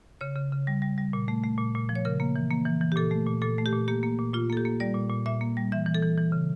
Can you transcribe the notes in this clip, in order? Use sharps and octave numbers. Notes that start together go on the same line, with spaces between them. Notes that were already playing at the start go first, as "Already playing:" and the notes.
C#3 C#5
C#3
C#3
G3
G3
G3
A#2
A3
A3
A#2
A#2
F3
C#5
C#3 A#4
A#3
E3
A#3
E3
E3
G4
A#2 A4
A3
A#2
A#2 A4
A3
G4
A#2
A#3 G4
A#3
A#2
A#2 F4
A#3 A4
G4
A#3
G3 D5
A#2
A#2
A#2 E5
A#3
G3
E3 E5
E3
A4
E3
E3
C#3